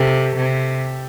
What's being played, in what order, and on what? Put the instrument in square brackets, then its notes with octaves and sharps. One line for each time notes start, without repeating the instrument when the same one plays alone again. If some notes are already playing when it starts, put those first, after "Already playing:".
Already playing: [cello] C3 [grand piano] G4 A4
[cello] C3